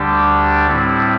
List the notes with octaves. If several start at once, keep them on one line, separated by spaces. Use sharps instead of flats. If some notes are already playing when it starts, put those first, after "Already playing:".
Already playing: D2 D3 G3 D4 G4
A2 G3 C4 E4